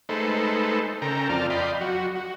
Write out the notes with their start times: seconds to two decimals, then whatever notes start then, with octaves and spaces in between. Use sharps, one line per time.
0.09 G#3 A3 D#4 A4 B4 C5
1.02 C#3 A4 A#4 G5 A#5
1.29 F2 C4 F4 D5 A5 F6
1.50 D5 D#5 F5 G5 B5 C6
1.81 F#3 F#4
2.15 F#4